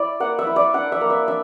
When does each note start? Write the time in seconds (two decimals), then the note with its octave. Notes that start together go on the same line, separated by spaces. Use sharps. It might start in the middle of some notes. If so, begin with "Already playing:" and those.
Already playing: E4 D5
0.20 A#3 F#5
0.39 E5
0.47 E4
0.56 D5
0.74 D4 F#5
0.92 E5
1.01 A#3
1.10 E5
1.28 D4 E5